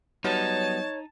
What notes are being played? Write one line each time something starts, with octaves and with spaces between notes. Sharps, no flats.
F#3 G3 B3 D#4 C#5 A5